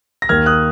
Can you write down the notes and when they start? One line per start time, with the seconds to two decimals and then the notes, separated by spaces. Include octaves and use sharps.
0.22 A#6
0.29 D#2 D#3 F6 G#6
0.46 D#6 F#6